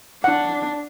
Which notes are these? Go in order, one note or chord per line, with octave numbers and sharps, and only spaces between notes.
D4 F#5